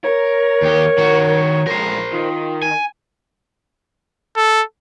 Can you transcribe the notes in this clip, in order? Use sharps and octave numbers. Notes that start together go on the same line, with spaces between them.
A#4 C#5
D#2 G4
D#3 F#4
F3 G#3 A#4 C5
D#3 F4
G#5
A4